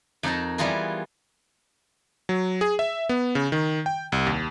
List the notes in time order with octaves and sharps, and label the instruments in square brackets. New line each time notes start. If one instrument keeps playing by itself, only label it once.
[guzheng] F2 D#4 A#4 A5
E3 G3 B3 F4 G#4 A#4
[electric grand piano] F#3
G#4
E5
B3
C#3
D#3
G5
C2
D#2